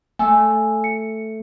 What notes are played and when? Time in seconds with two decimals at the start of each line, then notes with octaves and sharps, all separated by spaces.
0.19 A3 G#5 E6
0.84 C#7